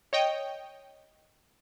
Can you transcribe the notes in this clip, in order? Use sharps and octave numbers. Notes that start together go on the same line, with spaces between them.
C#5 D#5 G5